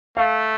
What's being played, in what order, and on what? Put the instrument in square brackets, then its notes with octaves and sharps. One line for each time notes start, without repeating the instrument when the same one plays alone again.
[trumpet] A3 [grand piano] F5